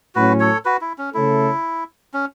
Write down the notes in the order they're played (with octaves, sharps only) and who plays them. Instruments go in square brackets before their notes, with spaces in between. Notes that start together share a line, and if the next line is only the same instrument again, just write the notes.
[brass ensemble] A2 F#3 C#4 [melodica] F#4 B4
[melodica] A4 C#5
F#4 B4
E4
C#4
[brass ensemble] C#3 A3 C#4 A4 [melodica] E4
[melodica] C#4